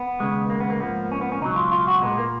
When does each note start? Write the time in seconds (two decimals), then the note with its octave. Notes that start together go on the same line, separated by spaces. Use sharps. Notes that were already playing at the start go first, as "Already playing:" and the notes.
Already playing: B3
0.20 D#2 C#3 G#3
0.50 A#3
0.60 B3
0.70 A#3
0.80 G#2 F3 A#3 B3
1.12 C#4
1.21 B3
1.32 C#4
1.41 C#2 B2 F#3 D#4
1.56 F4
1.72 F4
1.87 F#4
2.02 A#2 G#3 B3
2.18 A#3